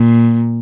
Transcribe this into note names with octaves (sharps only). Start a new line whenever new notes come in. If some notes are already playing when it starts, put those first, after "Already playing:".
Already playing: A#2